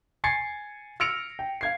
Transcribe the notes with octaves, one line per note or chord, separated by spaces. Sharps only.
G#5 G#6 A6 C7 C#7
E6 F6 A#6 C#7 D7 F7
G5
F5 G#6 C7